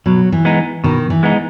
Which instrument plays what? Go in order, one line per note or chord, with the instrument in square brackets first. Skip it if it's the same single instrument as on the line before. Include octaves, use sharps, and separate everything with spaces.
[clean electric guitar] B2 [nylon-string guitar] F#3
[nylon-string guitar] E3
[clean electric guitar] G#3 B3 D#4
[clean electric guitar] B2 [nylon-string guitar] D#3
[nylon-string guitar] E3
[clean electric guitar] G#3 B3 D#4